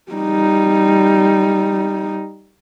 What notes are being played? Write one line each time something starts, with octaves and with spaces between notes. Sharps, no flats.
G3 D#4